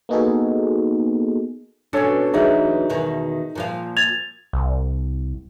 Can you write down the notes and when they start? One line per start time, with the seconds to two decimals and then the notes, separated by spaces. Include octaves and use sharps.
0.09 A#3 B3 D#4 F#4 G#4 A4
1.93 B2 C#4 D4 A4 C#5
2.34 D2 E3 F#3 D#4 G#4 C#5 E5
2.90 E2 B2 D#3
3.55 A#2 F3 F5
3.97 G#6 A6 F7
4.53 C2